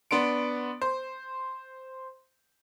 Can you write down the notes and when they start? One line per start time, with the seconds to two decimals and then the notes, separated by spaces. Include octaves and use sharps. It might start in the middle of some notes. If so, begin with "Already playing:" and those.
0.11 B3 D4 C6 D7
0.81 C5